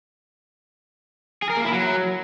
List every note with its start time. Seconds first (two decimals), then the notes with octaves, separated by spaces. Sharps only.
1.42 G#4
1.50 A#4
1.57 A#3
1.64 E4
1.72 F#3